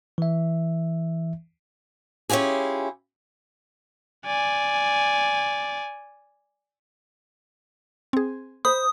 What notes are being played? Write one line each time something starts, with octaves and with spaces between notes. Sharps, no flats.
E3 E5
C#4 E4 F4 G4 G#4
D5 G#5
C4 G#4
C5 B5 D#6